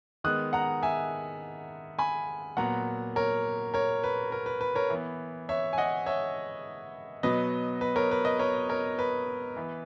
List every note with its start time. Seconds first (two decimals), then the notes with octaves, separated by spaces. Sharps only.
0.24 D#3 G#3 B3 D#6 F#6
0.53 F#5 A#5
0.82 E5 G#5
1.99 G#5 B5
2.57 A#2 F#3 B3 F#5 A#5
3.16 A#4 C#5
3.74 A#4 C#5
4.04 B4
4.32 A#4
4.46 B4
4.61 B4
4.75 A#4 C#5
4.90 E3 B3
5.49 C#5 E5
5.73 G#5
5.78 D#5 F#5
6.06 C#5 E5
7.23 B2 F#3 B3 B4 D#5
7.81 B4
7.96 A#4 C#5
8.11 B4
8.25 B4 D#5
8.39 A#4 C#5
8.69 A#4 C#5
8.99 B4
9.56 E3 B3